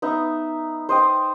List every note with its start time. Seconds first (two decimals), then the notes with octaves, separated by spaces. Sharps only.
0.02 B3 D#4 E5
0.89 C5 D#5 G5